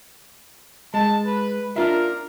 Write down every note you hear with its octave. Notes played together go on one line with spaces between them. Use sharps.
G#3 A5
B4
D4 F4 A#4 E5